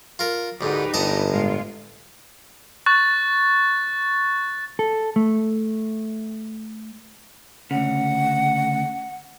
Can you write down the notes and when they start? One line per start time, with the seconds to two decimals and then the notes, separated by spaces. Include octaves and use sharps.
0.19 F4 A#4
0.61 D2 G#2 D#4 G4 B4
0.94 G1 D#5 A5 A#5
1.27 A2 G#3 F4
2.86 C#6 F#6 A6
4.79 A4
5.16 A3
7.71 D2 C#3 F#5